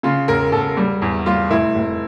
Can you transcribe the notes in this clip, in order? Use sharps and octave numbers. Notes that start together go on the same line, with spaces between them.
C#3 F4
E1 A#4
E1 A4
G3
E2
G3 F4
F1 E4
F1